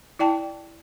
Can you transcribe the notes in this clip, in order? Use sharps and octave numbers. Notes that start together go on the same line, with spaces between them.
E4 D5 G5 A5